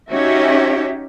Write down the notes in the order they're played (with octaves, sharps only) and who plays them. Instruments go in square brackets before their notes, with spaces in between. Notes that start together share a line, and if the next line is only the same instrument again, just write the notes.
[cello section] C#4 D#4 F#4 G4 C#5 E5